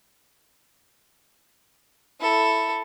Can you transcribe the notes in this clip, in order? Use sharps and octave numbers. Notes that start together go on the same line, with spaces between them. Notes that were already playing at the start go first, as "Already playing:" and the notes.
E4 A4